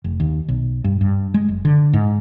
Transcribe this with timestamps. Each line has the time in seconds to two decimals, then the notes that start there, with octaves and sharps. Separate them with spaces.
0.04 F1
0.20 D#2
0.48 B1
0.84 G2
1.01 G2
1.34 G#3
1.49 F#1
1.65 D3
1.93 G#2